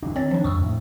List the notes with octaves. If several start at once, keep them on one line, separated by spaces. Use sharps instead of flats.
D#3 D4
C4 C#5 A6
F3 D4
F2 C#6 D#6 E6
A2